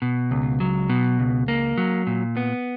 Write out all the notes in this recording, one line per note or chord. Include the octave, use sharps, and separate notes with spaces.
B2
C#2
F#3
B2
C#2
A#3
F#3
A#2
B3